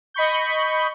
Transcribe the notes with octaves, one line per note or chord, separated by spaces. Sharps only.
D#5 B5 C#6 G6